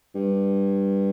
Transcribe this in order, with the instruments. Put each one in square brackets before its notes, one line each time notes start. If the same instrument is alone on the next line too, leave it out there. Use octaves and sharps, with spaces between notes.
[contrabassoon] G2